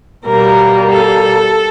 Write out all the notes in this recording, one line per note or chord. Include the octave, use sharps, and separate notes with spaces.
B2 G3 A#3 A#4
A4